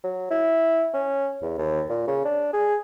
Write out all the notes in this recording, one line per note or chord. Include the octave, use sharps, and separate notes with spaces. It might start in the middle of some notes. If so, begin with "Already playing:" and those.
F#3
E4
C#4
E2
D#2
A#2
C#3
D4
G#4